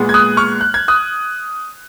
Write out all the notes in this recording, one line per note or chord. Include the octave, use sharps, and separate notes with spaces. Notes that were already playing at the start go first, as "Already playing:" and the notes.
Already playing: A#2 G#3 B3
G#6
D#6 F#6
C#6 F6
F#6
G#6
D#6 F#6